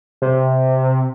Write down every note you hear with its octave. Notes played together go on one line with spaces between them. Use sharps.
C3